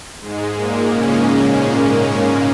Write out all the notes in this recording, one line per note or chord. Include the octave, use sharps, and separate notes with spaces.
G#2 G#3
A#2 A#3
C#3 C#4